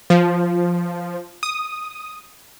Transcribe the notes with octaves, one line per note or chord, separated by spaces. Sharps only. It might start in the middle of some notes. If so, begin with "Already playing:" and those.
F3
D#6